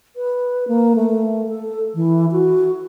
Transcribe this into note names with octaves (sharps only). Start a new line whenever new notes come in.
B4
A#3
A3
A4
E3
F#4